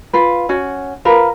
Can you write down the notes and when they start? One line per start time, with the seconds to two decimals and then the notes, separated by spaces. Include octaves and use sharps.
0.13 F4 B4
0.49 C#4 F#4
1.05 F4 A#4 B4